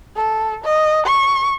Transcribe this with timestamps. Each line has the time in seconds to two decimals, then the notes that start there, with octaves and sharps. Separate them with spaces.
0.16 A4
0.64 D#5
1.06 C#6